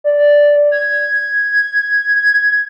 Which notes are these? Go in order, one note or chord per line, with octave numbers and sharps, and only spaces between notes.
D5
G#6